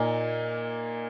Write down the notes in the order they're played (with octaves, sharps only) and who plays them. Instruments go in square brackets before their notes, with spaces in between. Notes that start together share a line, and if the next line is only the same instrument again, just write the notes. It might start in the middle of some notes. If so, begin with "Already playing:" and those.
Already playing: [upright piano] A#2 A#3 D#4 G#5